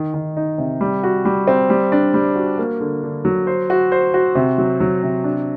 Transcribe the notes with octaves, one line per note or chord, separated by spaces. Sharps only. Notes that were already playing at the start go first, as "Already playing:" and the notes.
Already playing: D#3
D#3
D#4
C3
G3
F#4
G3
C4
G3
D4
G3
F#4
A#3
D3
D3
F#3
C5
F#4
C5
F#4
C3
F#3
F#3
C3
D4